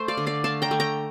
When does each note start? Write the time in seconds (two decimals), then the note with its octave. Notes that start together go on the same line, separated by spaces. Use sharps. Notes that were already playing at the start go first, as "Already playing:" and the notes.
Already playing: A3 C5
0.08 D5 F5
0.17 D3
0.26 D5 F5
0.44 A3 F5 A5
0.62 G5 A#5
0.71 A3
0.80 G5 A#5